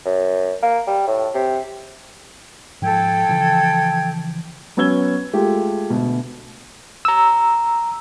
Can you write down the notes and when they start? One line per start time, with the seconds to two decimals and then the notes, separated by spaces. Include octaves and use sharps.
0.06 F#2
0.63 A#3
0.87 G3
1.08 A2
1.34 C3
2.82 G#2 F3 A4 G5 G#6
3.29 C#3 E3 F3
4.77 F#3 B3 C#4 E6 G#6 G7
5.33 G#3 A3 F4 G4
5.90 D2 B2
7.05 A#5 E6